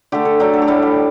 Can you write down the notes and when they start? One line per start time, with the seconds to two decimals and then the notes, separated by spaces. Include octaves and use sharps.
0.12 D3 A3 G4
0.25 A4
0.40 D3 F#3 A3 G4
0.53 A4
0.62 G4
0.67 A2 G3 A4
0.82 G4